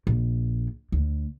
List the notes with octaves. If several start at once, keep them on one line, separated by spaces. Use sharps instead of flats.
A#1
D2